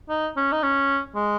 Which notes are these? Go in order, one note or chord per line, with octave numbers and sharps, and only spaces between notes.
D#4
C#4
D#4
C#4
G#3